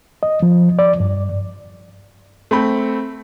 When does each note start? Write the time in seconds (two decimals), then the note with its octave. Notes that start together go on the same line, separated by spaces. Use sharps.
0.23 D#5
0.42 F3
0.79 D5
1.00 G2
2.51 A3 C4 B5